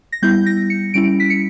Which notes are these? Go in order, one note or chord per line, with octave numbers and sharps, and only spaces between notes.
A#6
G3 B3 E4 G6
A#6
C#7
G3 C#4 E4 D7
B6
C#7